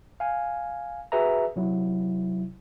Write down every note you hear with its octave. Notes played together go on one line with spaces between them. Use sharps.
F5 G#5
F#4 G#4 B4 E5 A#5
C3 F#3 E4